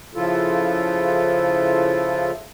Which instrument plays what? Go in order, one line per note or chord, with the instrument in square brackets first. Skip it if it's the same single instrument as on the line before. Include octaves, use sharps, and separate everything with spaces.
[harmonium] C#3 F3 E4 F4 A4